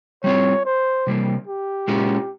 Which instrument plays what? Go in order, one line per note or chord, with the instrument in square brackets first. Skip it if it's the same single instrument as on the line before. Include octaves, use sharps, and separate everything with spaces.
[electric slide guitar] G3 C4 F4 [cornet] C#5
[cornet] C5
[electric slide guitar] C3 G3 A#3
[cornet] G4
[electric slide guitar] A#2 G#3 C#4 F4